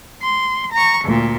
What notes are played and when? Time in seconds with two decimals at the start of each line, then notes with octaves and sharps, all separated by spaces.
0.22 C6
0.73 A#5 C#6
1.05 D2 A#2